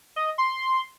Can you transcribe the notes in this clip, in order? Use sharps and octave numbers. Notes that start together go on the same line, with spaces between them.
D#5
C6